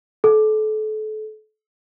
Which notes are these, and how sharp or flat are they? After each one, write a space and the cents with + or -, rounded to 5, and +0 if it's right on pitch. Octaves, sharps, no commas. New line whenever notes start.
A4 -35